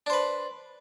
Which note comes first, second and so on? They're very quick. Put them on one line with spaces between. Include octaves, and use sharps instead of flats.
D4 C5 B4